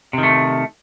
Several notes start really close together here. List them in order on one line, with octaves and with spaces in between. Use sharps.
C3 D#3 A3